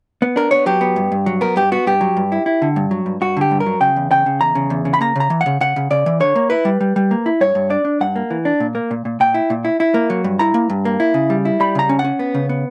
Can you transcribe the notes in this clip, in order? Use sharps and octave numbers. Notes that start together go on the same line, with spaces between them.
B3
D4 A#4
B3 C#5
F#3 G4
B3
G2
G2
F#3
B3 A#4
G2 G4
B3 F#4
G2 G4
F#3
G2
E4
E4
D3
G2
F#3
G2
G2 F#4
D3 G4
G2
A#4
F#3
C#3 G5
E2
C#3 G5
C#3
E2 A#5
C#3
E2
C#3
B5
A#3 A#5
C#3 A#5
E3
F#5
C#3
C#3 F#5
C#3
C#3 D5
E3
D3 C#5
A#3
E4 B4
G3
G3
G3
A#3
E4
G2 C#5
G2
D4 D5
D4
G2 F#5
A#3
E3
D4
A#2
A#3
A#2
A#2
A#2 G5
E4
A#2
E4
E4
A#3
F#3
G2
E4 A#5
A#3
G2
A#3
E4
C#3
G3
E4
G3 B5
C#3 A#5
C#4
F#5
C#4
B3
C#3
B3